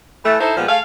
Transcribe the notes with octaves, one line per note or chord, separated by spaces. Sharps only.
E3 A3
D#4 E4 A4 C5
A#2 F3 G3 G#3 B3
A3 G#4 F5